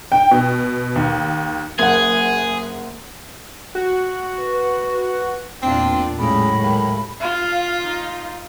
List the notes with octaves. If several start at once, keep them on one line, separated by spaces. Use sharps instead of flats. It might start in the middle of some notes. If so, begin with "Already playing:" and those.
G5
B2
D#2
F#1 G#4 F#5
F#4
B4
E2 A#2 A#3 C4 D4 F4
A2 C#3 F#3 G#3 B5
D#2
F4 F5
D#4